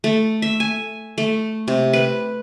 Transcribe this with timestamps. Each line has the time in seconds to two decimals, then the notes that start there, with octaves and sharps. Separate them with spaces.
0.04 A3
0.42 E5
0.60 G#5
1.18 A3
1.68 C3
1.93 B4